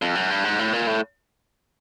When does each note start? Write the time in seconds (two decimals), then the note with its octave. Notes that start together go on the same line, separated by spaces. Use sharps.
0.02 F2
0.15 F#2
0.30 G2
0.45 G#2
0.59 A2
0.73 A#2
0.87 A2